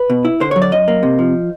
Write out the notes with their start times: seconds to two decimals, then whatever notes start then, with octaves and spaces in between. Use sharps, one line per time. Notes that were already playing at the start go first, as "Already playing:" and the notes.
Already playing: B4
0.10 B2
0.25 E4
0.40 D3 C5
0.51 C#5
0.56 F#3
0.62 D5
0.72 F#2 D#5
0.88 A#3
1.03 C3
1.19 F3